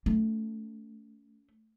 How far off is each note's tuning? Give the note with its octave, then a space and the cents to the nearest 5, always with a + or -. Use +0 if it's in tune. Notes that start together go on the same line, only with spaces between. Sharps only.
A3 +0 C#4 +35